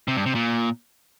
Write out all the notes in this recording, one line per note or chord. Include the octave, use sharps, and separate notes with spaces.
C3
G2
C3
A#2